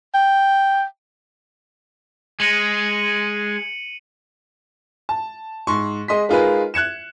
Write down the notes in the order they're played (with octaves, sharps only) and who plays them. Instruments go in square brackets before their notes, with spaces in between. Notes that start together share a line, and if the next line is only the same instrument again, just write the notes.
[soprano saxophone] G5
[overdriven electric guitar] G#3 [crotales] C#7 D#7 F#7
[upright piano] A5
G#2 C6 C#6
G#3 D#5 C6 B6
G#3 D#4 F4 G#4 A#4 B4
F#6 G#6 C#7 E7